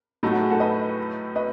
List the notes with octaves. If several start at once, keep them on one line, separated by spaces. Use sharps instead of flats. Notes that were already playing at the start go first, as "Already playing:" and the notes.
A2 F#3 A3 D#4
F#4
G#4
F#4 A4
B4 D#5
B4 D#5